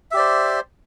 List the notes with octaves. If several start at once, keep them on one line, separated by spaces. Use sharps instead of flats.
G4 C5 D5 E5